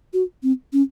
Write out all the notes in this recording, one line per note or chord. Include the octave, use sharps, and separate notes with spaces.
F#4
C4
C#4